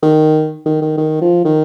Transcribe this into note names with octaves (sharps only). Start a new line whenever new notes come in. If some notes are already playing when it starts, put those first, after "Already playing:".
D#3
D#3
D#3
D#3
F3
D#3